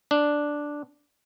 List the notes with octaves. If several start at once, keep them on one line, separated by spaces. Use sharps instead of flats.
D4